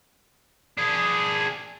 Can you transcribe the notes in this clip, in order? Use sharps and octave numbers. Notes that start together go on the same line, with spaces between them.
D4 G#4